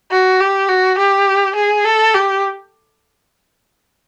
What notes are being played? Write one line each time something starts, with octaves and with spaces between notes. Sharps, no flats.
F#4
G4
F#4
G4
G#4
A4
G4